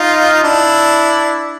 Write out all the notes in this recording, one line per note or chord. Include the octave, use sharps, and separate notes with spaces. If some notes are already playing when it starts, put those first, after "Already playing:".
Already playing: D#4 F4
F4
D4 E4